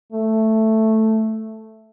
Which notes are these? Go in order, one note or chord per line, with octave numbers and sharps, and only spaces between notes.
A3